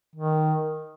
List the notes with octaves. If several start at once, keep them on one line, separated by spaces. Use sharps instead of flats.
D#3